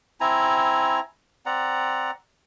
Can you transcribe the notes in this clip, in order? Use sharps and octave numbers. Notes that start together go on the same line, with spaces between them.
C4 E4 G#5 A#5
C4 D5 F#5 A#5